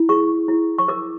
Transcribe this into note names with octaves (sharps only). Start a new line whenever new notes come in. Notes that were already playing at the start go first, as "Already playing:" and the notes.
Already playing: E4
G#4 C#6
E4
C#6
A#4 D6